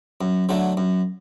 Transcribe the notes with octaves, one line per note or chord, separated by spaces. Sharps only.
F#2
D3 F#3 A3
F#2